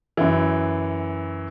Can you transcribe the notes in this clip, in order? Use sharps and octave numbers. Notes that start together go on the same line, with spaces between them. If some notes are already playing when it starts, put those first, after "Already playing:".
F#2 E3